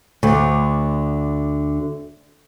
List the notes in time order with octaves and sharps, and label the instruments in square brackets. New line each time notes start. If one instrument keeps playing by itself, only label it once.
[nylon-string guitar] D2 D3